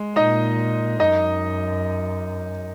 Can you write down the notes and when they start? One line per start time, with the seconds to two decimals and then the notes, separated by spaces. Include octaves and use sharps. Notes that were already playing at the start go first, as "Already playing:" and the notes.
Already playing: G#3
0.16 A#2 D#4 D#5
1.00 F#2 D#4 D#5